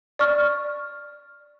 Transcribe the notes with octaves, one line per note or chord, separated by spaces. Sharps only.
D5 C#6 F6